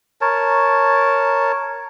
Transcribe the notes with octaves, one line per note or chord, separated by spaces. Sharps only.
A#4 C#5 A5